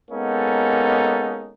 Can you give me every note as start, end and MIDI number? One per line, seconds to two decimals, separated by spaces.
0.11 1.54 56
0.11 1.54 58
0.11 1.54 59
0.11 1.54 61
0.11 1.54 63
0.11 1.54 69